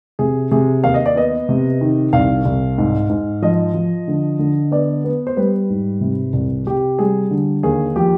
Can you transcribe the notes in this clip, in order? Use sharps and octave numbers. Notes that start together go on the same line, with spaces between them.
C3 G#4
C3 G#4
D#2 F5
D#5
D5
B3 D#5
C3
D#3
C2 F5
C2
G#2
G#2
F3 D#5
F3
D3
D3
B3 D5
B3
C5
G3 B4
G#2
C3
C2
C3 G4
G3 G#4
D3
D#2 G#4
F3 G4